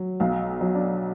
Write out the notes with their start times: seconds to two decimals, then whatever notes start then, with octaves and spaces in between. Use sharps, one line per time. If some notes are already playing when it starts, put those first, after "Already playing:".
Already playing: F#3
0.20 B1 F5
0.61 F#3
0.74 D4